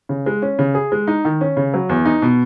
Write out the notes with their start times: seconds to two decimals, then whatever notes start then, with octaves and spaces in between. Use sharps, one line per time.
0.09 C#3
0.26 G#3
0.42 C#4
0.59 C#3
0.74 G#4
0.92 G#3
1.07 D#4
1.25 D#3
1.41 C#4
1.57 C#3
1.74 F#3
1.89 E2
2.05 D#4
2.22 B2